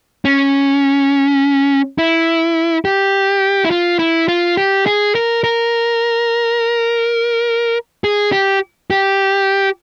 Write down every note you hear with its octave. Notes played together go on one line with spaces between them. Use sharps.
C#4
E4
G4
E4
F4
E4
F4
G4
G#4
A#4
A#4
G#4
G4
G4